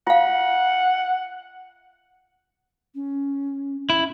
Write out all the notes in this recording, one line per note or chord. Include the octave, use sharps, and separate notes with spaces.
F4 F5 F#5
C#4
C#4 E4